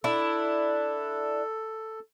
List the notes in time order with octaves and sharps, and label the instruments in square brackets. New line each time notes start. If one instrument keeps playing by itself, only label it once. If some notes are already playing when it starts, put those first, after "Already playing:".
[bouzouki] D4 E4 [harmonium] A4